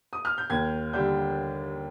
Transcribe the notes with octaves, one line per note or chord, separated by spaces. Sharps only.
D#6
F6
G6
D#2 G#6
D3 G3 D4 G6